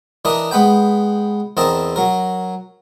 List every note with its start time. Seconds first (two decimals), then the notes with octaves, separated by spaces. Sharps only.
0.25 E3 D4 A#4 D#5 D#6
0.51 G#3 B3 B4 G5
1.57 E2 C4 A#4 D#5 A5
1.96 F#3 A#4